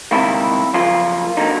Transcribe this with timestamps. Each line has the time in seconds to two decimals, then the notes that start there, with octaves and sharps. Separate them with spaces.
0.11 C#2 C3 D#3 G3 A#3 E4
0.74 F#2 C#3 F3 A#3 F4
1.37 D3 F#3 A#3 D#4